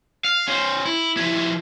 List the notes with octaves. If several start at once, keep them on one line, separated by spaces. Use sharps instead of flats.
F5
C#4 C5
E4
F3 E4